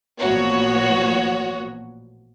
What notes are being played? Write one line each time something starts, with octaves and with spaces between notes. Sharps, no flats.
A1 A#2 F3 B3 F#4 C#5